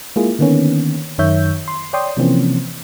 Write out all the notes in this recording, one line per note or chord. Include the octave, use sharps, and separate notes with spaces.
G#3 A#3 E4 F4 G#4
D3 D#3 A#3 B3 C#4
F#2 D#3 C#5 E5 G6
C6
C#5 D5 G5 C6 D#6
C3 E3 F3 A#3 C4 C#4